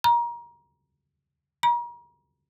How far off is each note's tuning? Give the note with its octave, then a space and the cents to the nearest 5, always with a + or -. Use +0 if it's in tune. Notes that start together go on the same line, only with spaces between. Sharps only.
A#5 +25
A#5 +40